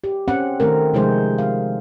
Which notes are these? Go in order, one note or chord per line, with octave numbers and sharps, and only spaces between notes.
G4
C4 C#4 F#5
D#3 A3 C4 A#4
C3 F3 G#3 D#4 G#4 C5
F5